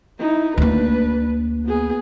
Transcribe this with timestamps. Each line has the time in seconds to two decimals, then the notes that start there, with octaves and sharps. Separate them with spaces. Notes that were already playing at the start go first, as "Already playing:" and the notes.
0.19 D#4 E4
0.58 D2 A#3 D4 B4
1.66 B3 G#4